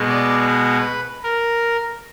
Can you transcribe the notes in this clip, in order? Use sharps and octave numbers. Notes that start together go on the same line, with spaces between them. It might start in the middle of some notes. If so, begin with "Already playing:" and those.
Already playing: B2 G#3 B3
D5
B4
A#4